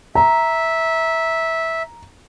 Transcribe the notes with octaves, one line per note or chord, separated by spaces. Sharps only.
E5 A#5